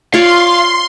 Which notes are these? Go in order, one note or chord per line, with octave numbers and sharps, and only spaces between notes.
F4 C#5 D5 F5 C6